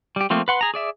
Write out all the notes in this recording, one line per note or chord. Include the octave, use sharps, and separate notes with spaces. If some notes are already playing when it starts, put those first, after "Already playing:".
G3 G4
F3 A3 A#3 C4
B4 F#5 C6
G#4 A#5
G#4 D5 E5